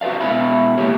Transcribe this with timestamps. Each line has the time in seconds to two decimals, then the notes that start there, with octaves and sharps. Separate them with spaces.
0.01 F#4 B4 C5 D5 F5
0.20 B2 G#3 E4 B4 F5 B5
0.78 E3 A#3 G4 B4 C#5